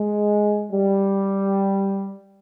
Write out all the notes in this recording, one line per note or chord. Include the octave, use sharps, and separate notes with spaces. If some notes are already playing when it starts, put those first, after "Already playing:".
Already playing: G#3
G3